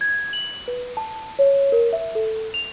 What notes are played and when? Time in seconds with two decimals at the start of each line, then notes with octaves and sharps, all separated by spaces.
0.01 G#6
0.33 F#7
0.68 B4
0.97 A5
1.39 C#5
1.72 A#4
1.93 E5
2.15 A4
2.54 F7